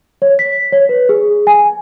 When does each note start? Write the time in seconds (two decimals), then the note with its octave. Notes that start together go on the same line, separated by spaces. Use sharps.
0.22 C#5
0.39 B6
0.72 C#5
0.89 B4
1.09 G#4
1.47 G#5